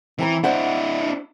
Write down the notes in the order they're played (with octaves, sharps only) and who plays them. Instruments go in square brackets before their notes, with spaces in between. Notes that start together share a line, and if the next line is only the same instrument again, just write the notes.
[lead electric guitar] E3 [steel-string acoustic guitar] C4 A5 A#5
[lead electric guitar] D4 E4 [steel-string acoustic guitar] C5 D5 F#5